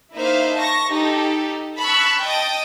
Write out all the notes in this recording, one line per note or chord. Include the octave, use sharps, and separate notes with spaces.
A#3 D#4 E4 C5 E5 F5
A5 C#6 A#6
D#4 G4 A4
A5 B5 C#6 E6 F#6
D#5 G5 A5 D#6 A6 D7